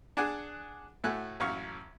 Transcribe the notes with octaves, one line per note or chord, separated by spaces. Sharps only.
D4 G#4 D5 F#5 G#5 D6
A2 A3 F#4 G#5 F#6
A1 F#2 F5 C#6